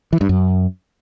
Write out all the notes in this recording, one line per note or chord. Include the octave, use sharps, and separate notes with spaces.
E3
G2
F#2